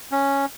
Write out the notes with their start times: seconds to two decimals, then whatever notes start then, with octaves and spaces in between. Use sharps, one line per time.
0.12 C#4